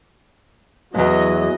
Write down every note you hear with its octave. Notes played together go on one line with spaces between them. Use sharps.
E2 G#2 F#3 D#5